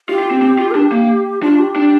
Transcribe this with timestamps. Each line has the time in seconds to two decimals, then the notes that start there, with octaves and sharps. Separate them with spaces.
0.09 F4 G4
0.19 F4
0.31 C4
0.42 C4
0.59 F4
0.71 A#4
0.75 D4 G4
0.92 A#3
1.42 D4 F4
1.59 G4
1.76 D4